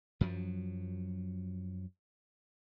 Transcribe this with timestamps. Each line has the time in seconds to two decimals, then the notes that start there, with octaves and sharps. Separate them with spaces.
0.21 F#2 F3 F#3